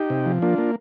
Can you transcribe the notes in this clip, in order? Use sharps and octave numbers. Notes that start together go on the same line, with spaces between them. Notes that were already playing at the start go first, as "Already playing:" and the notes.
Already playing: D#4 G4
C3
F3
A#3 D4 F4
A#3